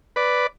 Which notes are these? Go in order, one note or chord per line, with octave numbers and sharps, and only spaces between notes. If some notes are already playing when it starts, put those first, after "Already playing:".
B4 D5